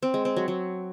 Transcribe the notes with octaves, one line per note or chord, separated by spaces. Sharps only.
C4
G#3
C4
F#3
F#3